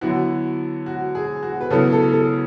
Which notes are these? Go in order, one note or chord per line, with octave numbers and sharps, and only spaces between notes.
D3 F#3 B3 E4 F#4
F#4
G#4
F#4
B4
C#3 F#3 B3 E4 A4
A4
A4